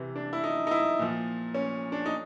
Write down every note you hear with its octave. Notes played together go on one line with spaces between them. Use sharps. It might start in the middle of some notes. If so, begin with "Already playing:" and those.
Already playing: C3 E3
D4
E4
D#4
D#4
E4
A#2 F3
C#4
D4
D#4